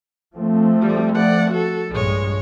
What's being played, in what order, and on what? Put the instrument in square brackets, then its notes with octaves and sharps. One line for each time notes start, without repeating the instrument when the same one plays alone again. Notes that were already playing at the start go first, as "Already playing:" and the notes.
[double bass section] F3 A3 C4
[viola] G3
D5 F#5
F#4 A4
[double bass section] A#1 G2 [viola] G#3 C#5